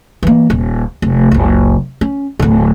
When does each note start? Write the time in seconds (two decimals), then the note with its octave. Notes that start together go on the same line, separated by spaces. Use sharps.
0.23 E3 A#3
0.50 D#1
1.02 F1
1.31 F#1 C#2
2.01 C#4
2.39 D1 D3